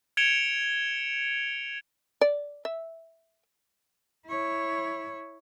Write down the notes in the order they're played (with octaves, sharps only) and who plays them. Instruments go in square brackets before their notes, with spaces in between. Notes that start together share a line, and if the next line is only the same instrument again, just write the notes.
[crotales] G#6 C#7 D7 E7 F7 G7
[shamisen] D5
E5
[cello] E4 C#5